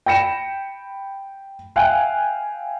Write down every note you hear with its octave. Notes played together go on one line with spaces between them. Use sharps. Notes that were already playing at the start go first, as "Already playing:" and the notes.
G5 B5 A#6 C#7 E7
E5 F5 G5 G#5 F#6